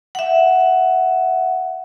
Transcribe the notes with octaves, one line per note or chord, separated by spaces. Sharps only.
E5 F#5